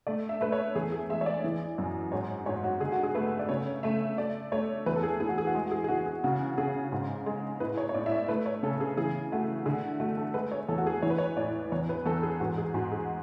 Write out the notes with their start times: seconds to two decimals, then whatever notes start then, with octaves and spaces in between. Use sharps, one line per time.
0.07 A3 D5
0.29 E5
0.41 A3 B4
0.52 C#5
0.75 E2 G#4
0.92 G#4
1.10 G#3 E5
1.21 C#5
1.26 D5
1.44 E3
1.78 F#2
2.12 G#2 C#5
2.46 G#2 C#5
2.64 F#4
2.80 D3 G#4
2.92 F#4
3.03 G#4
3.15 A3 B4
3.39 D5
3.49 C#3 C#5
3.83 A3 E5
4.18 A3 D5
4.52 A3 C#5
4.86 E2 B4
4.96 A4
5.03 G#4
5.20 E3 G#4
5.29 F#4
5.38 G#4
5.47 F#4
5.55 G#3 G#4
5.66 F#4
5.71 G#4
5.84 G#4
5.89 E3 F#4
6.06 G#4
6.24 C#3 F#4
6.58 C#3 G#4
6.92 G#2
7.26 G#3
7.60 A2 B4
7.78 C#5
7.89 C#5
7.94 A2 D5
8.06 E5
8.12 D5
8.28 A3 B4
8.46 C#5
8.63 C#3 A4
8.80 G#4
8.97 E3 G#4
9.32 A3 F#4
9.66 D3 G#4
10.00 A3 F#4
10.17 A4
10.34 G#3 B4
10.52 C#5
10.69 E2 A4
10.78 F#4
10.87 G#4
11.02 E3 C#5
11.10 B4
11.18 C#5
11.37 A2 D5
11.72 E2 C#5
11.89 B4
12.06 E2 A4
12.23 G#4
12.40 G#2 F#4
12.58 G#4
12.74 G#2 F#4
12.92 G#4